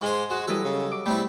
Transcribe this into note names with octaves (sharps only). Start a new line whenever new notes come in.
G#2 G#3 C5
G#3 F#4
E3 F#3 G3 A4 D#5
C#3
D6
B2 G3 A3 C4 E4